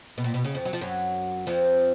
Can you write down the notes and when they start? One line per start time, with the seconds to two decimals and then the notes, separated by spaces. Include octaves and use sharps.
0.18 B2
0.24 A#2
0.34 B2
0.44 C#3
0.55 F2 F3
0.65 F#3
0.73 F3
0.81 F#2 F#3
1.47 F2 F3